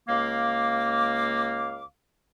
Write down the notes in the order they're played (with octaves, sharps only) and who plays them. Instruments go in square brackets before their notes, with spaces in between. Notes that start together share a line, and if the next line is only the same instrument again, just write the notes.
[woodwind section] C#2 A#3 F5 D6